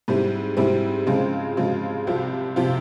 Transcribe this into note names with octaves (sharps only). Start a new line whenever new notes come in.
G#2 G3 C4 E4
G#2 G3 C4 E4
C#3 F3 G#3 C4 F4
C#3 F3 G#3 C4 F4
C2 C3 F3 C4 F4
C3 F3 C4 F4